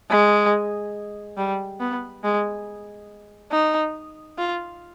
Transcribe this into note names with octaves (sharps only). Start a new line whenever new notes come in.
G#3
G3
B3
G#3
D#4
F4